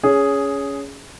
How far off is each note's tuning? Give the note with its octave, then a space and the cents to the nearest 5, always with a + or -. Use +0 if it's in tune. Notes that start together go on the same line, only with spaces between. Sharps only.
C#4 +15 G#4 +0